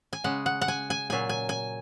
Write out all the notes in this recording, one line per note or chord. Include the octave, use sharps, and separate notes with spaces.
G#5
C#3 G#3 F#5
F#5
F#5
G#5
G#5
A#2 F#3 G#5
G#5
G#5